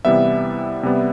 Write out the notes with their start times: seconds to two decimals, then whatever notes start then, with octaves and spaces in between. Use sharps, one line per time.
0.05 C3 E3 G3 B3 E5
0.83 C3 G3 B3